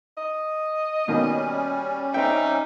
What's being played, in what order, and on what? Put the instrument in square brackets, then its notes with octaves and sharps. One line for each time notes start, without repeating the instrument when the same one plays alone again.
[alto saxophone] D#5
[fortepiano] B2 D#3 A#3 [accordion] G3 C#4
[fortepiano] C4 G5 [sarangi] D#4 [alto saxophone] E5